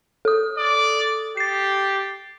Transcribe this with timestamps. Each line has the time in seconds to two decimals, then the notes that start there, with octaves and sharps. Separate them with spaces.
0.25 A4 D#6
0.58 D5
1.37 G4 A6 C7